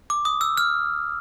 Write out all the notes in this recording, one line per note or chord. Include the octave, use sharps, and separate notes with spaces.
D6
D#6
E6
F6